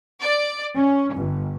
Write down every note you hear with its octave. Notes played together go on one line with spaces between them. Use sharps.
D5
C#4
G1